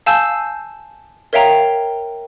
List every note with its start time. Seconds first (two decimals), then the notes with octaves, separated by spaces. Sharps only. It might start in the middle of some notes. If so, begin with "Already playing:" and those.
0.06 F5 G#5 A5 E6 G6
1.33 A#4 C#5 E5 F5 G5 A#5